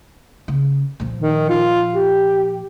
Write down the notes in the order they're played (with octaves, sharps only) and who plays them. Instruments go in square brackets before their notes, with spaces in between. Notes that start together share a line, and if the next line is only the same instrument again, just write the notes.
[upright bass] C#3
A#2 F3
[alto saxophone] D#3
F4
G4